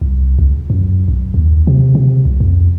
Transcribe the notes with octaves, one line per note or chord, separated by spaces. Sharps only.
C2
C#2
F#2
B1
D#2
C3
C3
C2
F2